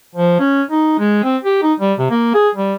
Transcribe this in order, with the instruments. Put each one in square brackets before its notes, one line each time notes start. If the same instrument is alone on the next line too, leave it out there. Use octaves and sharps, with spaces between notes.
[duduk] F3
C#4
D#4
G#3
C4
G4
D#4
G3
C3
A#3
G#4
G3